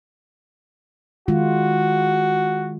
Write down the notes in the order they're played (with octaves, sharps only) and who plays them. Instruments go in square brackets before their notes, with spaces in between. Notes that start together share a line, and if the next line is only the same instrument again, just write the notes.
[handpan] D#3 G#3 F4 [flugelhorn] F#4